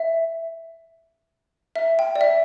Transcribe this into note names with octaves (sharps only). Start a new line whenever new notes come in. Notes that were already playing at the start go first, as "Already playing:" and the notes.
Already playing: E5
E5
G5
D5
E5